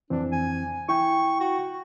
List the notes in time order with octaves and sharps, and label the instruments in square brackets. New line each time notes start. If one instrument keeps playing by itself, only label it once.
[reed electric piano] F2 E3 C4 [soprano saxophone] D4
[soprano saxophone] G#5
[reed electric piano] E4 G5 [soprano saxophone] C#6
[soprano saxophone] F#4